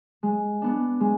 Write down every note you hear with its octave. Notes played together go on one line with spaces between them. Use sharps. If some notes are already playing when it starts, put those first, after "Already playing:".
G#3
B3 D4
G#3